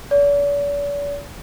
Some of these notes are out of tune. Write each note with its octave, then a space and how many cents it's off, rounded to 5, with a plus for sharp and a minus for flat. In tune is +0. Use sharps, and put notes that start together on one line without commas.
D5 -45